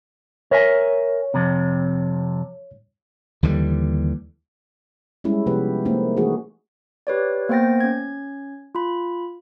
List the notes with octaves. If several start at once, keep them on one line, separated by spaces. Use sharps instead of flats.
A#4 C#5 E5 G#5
F2 C3
D#2 D3 E3 G3
G3 G#3 C#4 E4
C3 F3 B3 G4 B4
A3 A#3 C4 D#4
E3 A3 D#4 F#4 G#4
G4 B4 C#5 D5
A#3 B3 C5 G5 A6 A#6
C#4 G#6
F4 B5